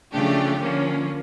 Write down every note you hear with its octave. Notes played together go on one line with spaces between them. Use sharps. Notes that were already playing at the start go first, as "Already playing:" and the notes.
C#3 F3 A3 D4 G4
D3 F3 A#3 C#4